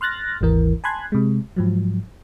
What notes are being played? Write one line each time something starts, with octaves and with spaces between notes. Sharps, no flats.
C6 F6 F#6 A6 A#6
G#1 D#2 E3 A#4
G#5 A5 B5 C6 F#6 G#6
C3 G#3
G#2 F3 F#3